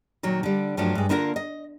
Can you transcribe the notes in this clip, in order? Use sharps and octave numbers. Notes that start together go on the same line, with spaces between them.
A#2 D#3 F#3
D3 G3
G2 F3 F#3 A3 D4
G2 G#3
D3 A#3 D4 E4 F4 A#4
D#5